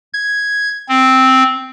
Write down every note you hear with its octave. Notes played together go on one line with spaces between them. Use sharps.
G#6
C4